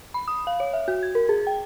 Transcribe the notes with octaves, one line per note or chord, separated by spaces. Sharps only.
B5
D#6
F5
C#5
E5
F#4
G#6
A#4
G#4
G5